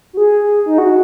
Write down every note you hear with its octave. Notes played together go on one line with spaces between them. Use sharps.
F#4
G#4
D#4
F#4